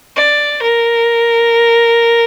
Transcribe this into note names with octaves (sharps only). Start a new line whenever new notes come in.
D5
A#4